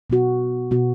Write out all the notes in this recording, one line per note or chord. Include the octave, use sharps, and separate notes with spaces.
B2 B3 F#4
B2 B3 F#4